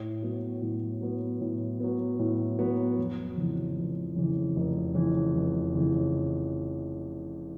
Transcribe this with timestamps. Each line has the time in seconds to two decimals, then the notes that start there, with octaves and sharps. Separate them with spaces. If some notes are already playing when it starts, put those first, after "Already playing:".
Already playing: A2
0.22 F#3 B3
0.62 A2
1.01 F#3 B3
1.41 A2
1.80 F#3 B3
2.19 A2
2.59 F#3 B3
2.98 F1
3.37 F2 C#3 E3
3.77 F1
4.16 F2 C#3 E3
4.56 F1
4.95 F2 C#3 E3
5.35 F1
5.74 F2 C#3 E3